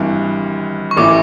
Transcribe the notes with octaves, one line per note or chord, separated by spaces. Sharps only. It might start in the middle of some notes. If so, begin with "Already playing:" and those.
Already playing: G#1 G2 E3
C#6
A1 A2 E3 A3 D6